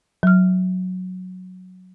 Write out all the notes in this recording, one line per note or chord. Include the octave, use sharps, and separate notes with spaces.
F#3 F6